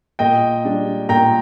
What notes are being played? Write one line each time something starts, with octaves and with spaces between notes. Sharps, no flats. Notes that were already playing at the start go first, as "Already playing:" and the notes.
A#2 D#5 G5
G3 D4
A#2 G5 A#5